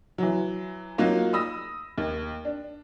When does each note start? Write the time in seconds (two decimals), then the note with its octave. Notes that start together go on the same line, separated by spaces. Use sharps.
0.18 E3 F#3
0.98 F#3 A#3 D#4 F4 F#4
1.33 B5 D#6 E6 A#6
1.98 D#2
2.45 D4